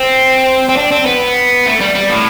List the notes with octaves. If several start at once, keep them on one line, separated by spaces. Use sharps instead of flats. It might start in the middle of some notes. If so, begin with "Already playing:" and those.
Already playing: C4
C4
D4
C4
B3
A3
G3
G3
A2